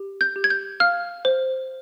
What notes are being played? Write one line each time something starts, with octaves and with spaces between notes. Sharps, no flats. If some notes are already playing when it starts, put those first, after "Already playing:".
Already playing: G4
G6
G4
G#6
G6
F5 F6
C5